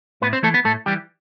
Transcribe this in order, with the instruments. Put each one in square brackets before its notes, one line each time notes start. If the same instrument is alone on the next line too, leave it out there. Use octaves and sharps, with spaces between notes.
[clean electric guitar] A2 B3 B4
C4 C5
E3 A3 A4
B3 B4
A2 A3 A4
E3 G3 G4